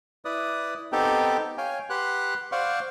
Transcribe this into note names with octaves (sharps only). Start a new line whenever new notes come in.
E4 B4 D5 D#6
B3 C4 D#4 G4 A4 G5
C#5 F5 G5 G#5
G4 B4 F#5 C6 F#6
C5 D5 F5 F#5 C6 C#6